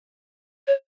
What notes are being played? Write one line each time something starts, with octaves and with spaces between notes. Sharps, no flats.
C#5